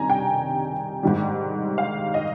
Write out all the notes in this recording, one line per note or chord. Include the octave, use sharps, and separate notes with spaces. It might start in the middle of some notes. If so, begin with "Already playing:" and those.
Already playing: C3 D#3 G3 G#5 A#5
G5
G#2 D#3 G3
F5
D#5